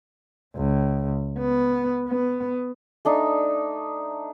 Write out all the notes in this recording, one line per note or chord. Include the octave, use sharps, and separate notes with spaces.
C#2
B3
B3
A3 D4 D#4